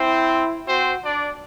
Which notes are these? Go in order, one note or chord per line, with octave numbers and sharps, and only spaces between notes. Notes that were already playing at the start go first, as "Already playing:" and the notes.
Already playing: C4 E4 C5
C4 F#4 C5
D4 D5